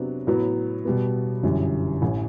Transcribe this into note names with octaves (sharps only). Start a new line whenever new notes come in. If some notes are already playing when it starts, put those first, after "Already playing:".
Already playing: C3 F#3 B3 D4
A2 F#3 B3
B2 G3 B3
G1 F#2 E3 G3
A1 A2 E3